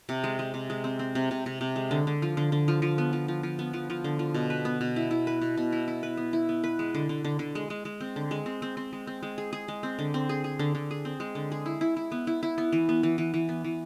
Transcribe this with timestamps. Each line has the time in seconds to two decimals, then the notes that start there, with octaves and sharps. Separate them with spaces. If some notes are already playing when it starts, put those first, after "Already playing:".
0.09 C3
0.24 G#3
0.39 G#3
0.54 C3
0.70 G#3
0.84 C4
0.99 C4
1.15 C3
1.31 C3
1.46 C3
1.61 C3
1.76 G#3
1.91 D3
2.07 D3
2.22 F3
2.37 D3
2.52 D3
2.68 F3
2.82 F3
2.98 B3
3.13 F3
3.28 F3
3.43 F3
3.59 B3
3.73 F3
3.90 F3
4.04 D3
4.19 F3
4.34 B2
4.50 B4
4.65 B3
4.81 B2
4.96 E4
5.11 E4
5.27 B4
5.41 B2
5.57 B2
5.72 E4
5.88 E4
6.03 B4
6.17 B3
6.33 E4
6.49 B3
6.64 B4
6.79 G#3
6.95 D3
7.09 D3
7.24 D3
7.39 D3
7.55 G#3
7.70 G#3
7.85 G#3
8.01 C4
8.16 D3
8.31 G#3
8.46 C4
8.62 C4
8.77 C4
8.93 G#3
9.07 C4
9.23 G#3
9.38 G#4
9.53 G#4
9.68 G#3
9.83 C4
9.99 D3
10.14 C4
10.29 G#4
10.44 G#4
10.59 D3
10.75 D3
10.91 G#4
11.05 C4
11.20 G#3
11.35 D3
11.52 G#4
11.66 E4
11.81 E4
11.97 E4
12.12 B3
12.27 E4
12.43 E4
12.58 B3
12.72 E3
12.89 B3
13.03 E3
13.18 E3
13.34 E3
13.49 B3
13.64 E3